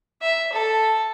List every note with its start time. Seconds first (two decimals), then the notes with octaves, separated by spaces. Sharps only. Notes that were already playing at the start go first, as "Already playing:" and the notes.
0.22 E5
0.53 A4